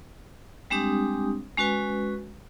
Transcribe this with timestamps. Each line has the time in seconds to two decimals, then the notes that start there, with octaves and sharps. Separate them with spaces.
0.70 G3 G#3 C4 D4 G4 D#6
1.57 G#3 C#4 F#4 B4 G#5